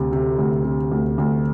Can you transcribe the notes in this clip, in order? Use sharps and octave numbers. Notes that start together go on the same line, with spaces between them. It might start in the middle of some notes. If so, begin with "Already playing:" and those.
Already playing: D2 C3
C3
D2
C3
D2
D2